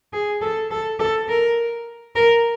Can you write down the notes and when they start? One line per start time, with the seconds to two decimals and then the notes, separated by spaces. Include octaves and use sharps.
0.13 G#4
0.41 A4
0.71 A4
0.99 A4
1.28 A#4
2.15 A#4